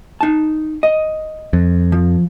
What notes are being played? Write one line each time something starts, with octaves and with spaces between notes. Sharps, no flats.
D#4 A5
D#5
F2
F3